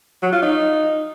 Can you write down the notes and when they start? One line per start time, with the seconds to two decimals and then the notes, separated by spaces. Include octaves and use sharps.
0.23 F#3
0.33 F4
0.42 D#4